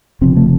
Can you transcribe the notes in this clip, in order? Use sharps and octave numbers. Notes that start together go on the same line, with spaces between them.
F1 F2 C#3 C4
A3